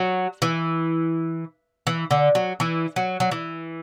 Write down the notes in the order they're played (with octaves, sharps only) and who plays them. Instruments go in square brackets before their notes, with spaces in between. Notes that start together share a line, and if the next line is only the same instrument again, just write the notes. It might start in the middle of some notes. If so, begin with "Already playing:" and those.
Already playing: [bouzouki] F#3
E3
E3
D3
F#3
E3
F#3
F#3
E3